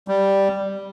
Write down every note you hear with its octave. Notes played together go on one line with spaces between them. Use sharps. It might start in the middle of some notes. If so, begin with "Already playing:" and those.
G3